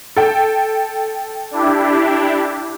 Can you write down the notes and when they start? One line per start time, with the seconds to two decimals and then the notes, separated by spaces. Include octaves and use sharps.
0.17 A4 G5
1.51 D4 E4 G4